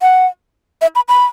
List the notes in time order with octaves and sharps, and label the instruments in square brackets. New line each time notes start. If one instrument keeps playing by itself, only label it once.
[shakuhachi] F#5
E5
B5
B5